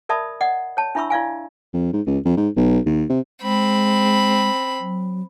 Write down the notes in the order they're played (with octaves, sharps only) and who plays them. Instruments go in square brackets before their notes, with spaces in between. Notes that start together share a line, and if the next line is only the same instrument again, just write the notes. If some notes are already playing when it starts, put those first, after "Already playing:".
[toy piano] A#4 D5 E5 A5 B5 D#6
D5 D#5 F#5
C#5 A5
D4 E4 E5 B5 C#6 E6
E4 D5 F5 G#5
[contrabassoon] F2
G#2
C#2
F2
G#2
B1
D#2
C3
[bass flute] G#3 [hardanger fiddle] C4 B5
[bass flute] F#3